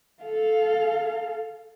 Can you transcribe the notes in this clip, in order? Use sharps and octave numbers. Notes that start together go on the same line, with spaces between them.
A4 F5